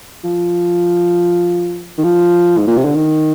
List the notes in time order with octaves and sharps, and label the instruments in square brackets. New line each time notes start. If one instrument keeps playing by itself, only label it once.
[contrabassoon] F3
D#3
F3
G#2
A#2
C3
D3
D#3